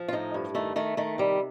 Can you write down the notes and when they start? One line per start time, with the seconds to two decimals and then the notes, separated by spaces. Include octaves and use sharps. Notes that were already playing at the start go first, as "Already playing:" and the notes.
Already playing: F3
0.08 F4
0.13 A2 D#4
0.34 G2
0.55 D#3 A3
0.76 D#3 A3
0.97 D#3 A3
1.18 C3 G3